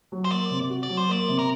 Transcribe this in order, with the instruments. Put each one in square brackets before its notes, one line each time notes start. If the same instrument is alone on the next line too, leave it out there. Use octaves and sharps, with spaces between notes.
[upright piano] F#3
[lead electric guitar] C5
[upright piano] A#3 [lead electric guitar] D5
[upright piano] C3
F#4
[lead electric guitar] D5
[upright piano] F#3
[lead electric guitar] C5
[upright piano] A#3 [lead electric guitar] D5
[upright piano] C3
[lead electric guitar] A#4